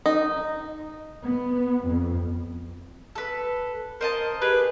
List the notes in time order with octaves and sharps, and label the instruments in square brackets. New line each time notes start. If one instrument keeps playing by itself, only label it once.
[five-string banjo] D#4
[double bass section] B3
F2
[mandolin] A4 B4
[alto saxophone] A#4 [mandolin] C5 D#5 A5
[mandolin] G4 G#4 [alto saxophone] B4